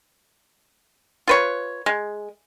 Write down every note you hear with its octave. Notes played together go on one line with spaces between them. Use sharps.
F4 B4 C#5
G#3